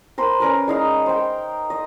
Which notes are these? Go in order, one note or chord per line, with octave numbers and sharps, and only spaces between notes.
A#4 C5 B5
C#4 A#4 B4
G#3 D#4 F5
C5 G5
D#5